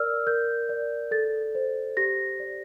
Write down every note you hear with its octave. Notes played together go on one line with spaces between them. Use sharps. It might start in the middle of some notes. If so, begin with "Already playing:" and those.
Already playing: A#4 D5 E6 F6
A#4 G6
D5
A4 A6
C5
G4 A#6
D5